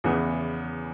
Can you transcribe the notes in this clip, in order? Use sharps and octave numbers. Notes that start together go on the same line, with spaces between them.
E2 C#3 E3 B3